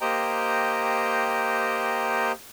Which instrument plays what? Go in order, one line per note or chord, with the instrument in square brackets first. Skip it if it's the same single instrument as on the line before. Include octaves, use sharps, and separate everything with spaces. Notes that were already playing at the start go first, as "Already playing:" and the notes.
[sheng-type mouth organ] A#3 G4 C5 D#5 G5 A#5